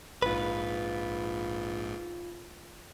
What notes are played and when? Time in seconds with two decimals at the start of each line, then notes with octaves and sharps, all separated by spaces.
0.22 A#1 G#2 F4 B4